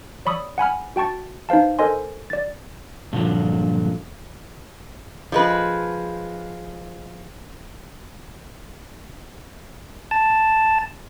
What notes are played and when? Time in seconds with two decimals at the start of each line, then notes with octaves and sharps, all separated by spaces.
0.26 C#5 D5 B5 C#6 D#6 E6
0.58 F#5 G#5 B5 F6
0.96 F#4 G5 A5 C#6 A6
1.49 D#4 B4 C5 F5 A5
1.79 A4 A#4 C5 D#5 G#5 C6
2.30 D5 A6
3.13 G2 A#2 D3 F3 F#3
5.32 F3 G#3 B4
10.11 A5